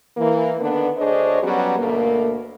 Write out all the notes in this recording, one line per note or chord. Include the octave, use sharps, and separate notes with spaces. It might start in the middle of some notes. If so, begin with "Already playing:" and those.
E3 A#3
D3 D#3 B3 D4 B4
D2 D4 G#4 C5 C#5 D#5
F#3 G3 B3 C#4 F#4 G4
D2 B2 A3 A#3